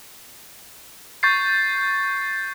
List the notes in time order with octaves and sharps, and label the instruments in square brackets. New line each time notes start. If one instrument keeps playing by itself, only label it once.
[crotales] C#6 G6 A6 C7